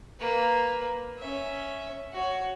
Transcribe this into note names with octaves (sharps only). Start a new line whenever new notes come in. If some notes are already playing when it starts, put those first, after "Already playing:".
A#3 B4
C#4 E5
F#4 C#5